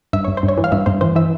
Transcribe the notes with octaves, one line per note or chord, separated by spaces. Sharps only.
G2 E5
G2 C#5
C5
G2
C#5
E3
F5
G2 E5
G2 C5
E3 C5
E3 E5